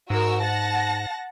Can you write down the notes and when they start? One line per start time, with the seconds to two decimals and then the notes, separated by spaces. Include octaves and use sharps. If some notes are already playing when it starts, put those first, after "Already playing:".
0.10 G#2 F#4 A#4 E6
0.42 F#5 A5 A#6